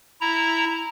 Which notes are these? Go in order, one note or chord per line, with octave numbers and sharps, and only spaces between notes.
E4 A#5